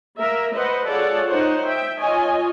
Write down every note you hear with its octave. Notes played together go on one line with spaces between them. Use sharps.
A#3 A#4 E5
B4 C5 D#5 F#5
F4 G#4 A4 C#5 D5 F#5
D#4 C5 C#5 F#5
E5 G5
F4 C#5 D#5 G#5